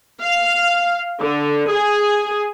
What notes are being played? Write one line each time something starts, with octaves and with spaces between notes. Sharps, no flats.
F5
D3
G#4